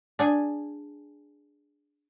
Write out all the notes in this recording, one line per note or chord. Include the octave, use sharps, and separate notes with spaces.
D4 G#4 G#5